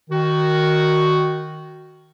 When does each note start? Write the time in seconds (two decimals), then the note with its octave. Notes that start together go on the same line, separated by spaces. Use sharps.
0.10 D#3 F#4